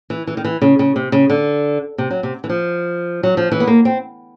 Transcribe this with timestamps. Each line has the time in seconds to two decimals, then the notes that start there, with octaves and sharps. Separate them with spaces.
0.10 E3
0.27 E3
0.37 D#3
0.44 E3
0.62 C#3
0.79 C#3
0.96 C3
1.12 C#3
1.30 D3
1.98 C3
2.11 F#3
2.23 C3
2.44 E3
2.49 F3
3.23 F#3
3.37 F3
3.52 E3
3.60 B3
3.67 A#3
3.85 C4